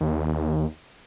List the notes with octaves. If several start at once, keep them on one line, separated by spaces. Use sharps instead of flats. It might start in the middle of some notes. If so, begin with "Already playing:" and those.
D#2